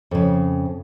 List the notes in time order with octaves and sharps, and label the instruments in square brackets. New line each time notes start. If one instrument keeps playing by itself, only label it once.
[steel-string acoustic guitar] F2 C#3